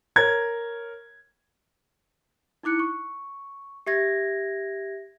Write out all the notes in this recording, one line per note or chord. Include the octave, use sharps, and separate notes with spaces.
A#4 C#5 G#6
D#4 E4 D6 F#6 C#7
C#6
G4 E5 G#6 A#6